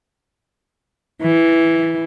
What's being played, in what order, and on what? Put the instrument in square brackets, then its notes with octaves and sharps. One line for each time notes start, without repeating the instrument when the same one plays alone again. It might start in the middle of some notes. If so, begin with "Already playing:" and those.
[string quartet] E3